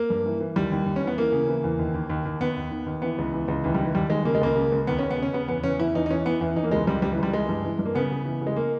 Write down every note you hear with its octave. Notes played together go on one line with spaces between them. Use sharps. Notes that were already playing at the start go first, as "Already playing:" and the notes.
Already playing: A#3
G2
E3
E3
D#2 G3
D#2
D#2
C#4
E3 B3
E3 A#3
C#3
E3
E2
D#2
D#2
D#2
D#2
D#2 B3
D#2
D#3
D#2
E3 B3
C#2
E3
C#2
D#2 E3
G3
D#3
E3
D#2 G3
D#3 G#3
C#3 A#3
G#3
C#2 A#3
C#3
C#2
D#2 B3
C#3 C#4
B3
C#3 C#4
C#3 B3
E2 B3
E2 C#4
E2 E4
E2 D#4
D#4
E3 C#4
E3 B3
E2 E4
E2 D#4
A#3
C#2 G#3
C#2 G3
C#2 G3
E3
C#2 G3
E3 G#3
G2
E3
G2
A#3
C#3 B3
C#3
E3
C#3
G#3
A#3